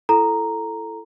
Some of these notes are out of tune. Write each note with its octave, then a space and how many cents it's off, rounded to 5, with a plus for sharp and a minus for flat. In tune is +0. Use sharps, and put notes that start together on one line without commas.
E4 +25 A4 +0 A#5 +0